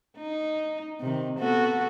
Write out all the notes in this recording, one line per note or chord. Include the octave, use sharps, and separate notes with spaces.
D#4
C3 D#3
B3 F#4 A4